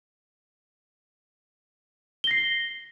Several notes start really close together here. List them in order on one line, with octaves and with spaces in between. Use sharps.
G7 A#6 C7